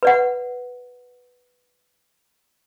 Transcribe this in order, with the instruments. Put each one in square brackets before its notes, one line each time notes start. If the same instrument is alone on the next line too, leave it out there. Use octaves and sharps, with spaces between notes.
[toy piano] B4 D5 F#5